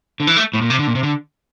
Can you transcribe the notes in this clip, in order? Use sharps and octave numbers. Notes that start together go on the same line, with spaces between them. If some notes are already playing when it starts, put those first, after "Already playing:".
D3
E3
A3
A2
A#2
C3
D3
A#2
C3
D3